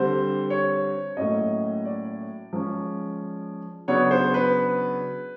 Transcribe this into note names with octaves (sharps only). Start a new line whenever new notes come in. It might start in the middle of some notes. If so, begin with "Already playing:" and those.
Already playing: D3 G3 C4 C5
C#5
A2 F#3 A#3 C#4 D#5
D5
F3 G#3 C#4
C#3 F#3 B3 D4 C#5
C5
B4